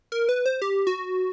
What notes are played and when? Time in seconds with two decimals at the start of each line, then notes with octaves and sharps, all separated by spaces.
0.12 A#4
0.29 B4
0.46 C5
0.62 G4
0.87 F#4